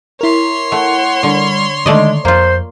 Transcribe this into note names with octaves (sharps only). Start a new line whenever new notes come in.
E4 A#4 C#5 C6
A3 F#5
D3 G3
D3 D#3 G#3 A3 D5 D#5
F2 A#3 F4 C5